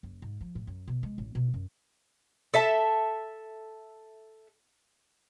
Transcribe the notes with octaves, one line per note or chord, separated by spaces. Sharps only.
F#1
G#2
F3
A2
F#2
B2
G#3
A1
B2
F#2
A4 E5 A5